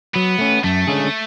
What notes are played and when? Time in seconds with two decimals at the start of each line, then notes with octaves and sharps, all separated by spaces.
0.15 F#3 B3
0.39 A3 C#4
0.64 F#2 A3
0.87 D3 G#3 C#4 G#4